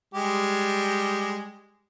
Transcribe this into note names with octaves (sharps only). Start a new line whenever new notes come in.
G3 G#3 G4